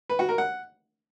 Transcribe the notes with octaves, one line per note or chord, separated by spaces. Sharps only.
B4
F#4
A#4
F#5